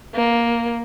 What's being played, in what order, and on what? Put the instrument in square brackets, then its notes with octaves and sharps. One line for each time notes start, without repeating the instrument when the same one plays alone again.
[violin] A#3